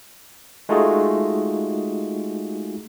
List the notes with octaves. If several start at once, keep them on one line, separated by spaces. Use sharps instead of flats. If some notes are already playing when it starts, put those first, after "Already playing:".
G#3 A3 D#4 F4 F#4 G#4